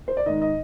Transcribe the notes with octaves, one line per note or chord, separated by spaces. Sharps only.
C5
D5
G#2 D#3 D#5
D#5